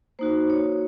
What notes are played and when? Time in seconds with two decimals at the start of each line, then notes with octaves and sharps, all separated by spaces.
0.19 A#3 D#4 F#4 C5
0.50 C#5